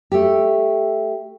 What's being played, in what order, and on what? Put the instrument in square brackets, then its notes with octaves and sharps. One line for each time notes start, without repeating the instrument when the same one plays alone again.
[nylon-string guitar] A3 G4